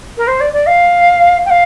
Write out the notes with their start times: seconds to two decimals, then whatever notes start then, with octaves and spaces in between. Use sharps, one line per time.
0.17 A#4
0.27 C5
0.40 D5
0.53 D5
0.66 F5
1.45 G5
1.50 F5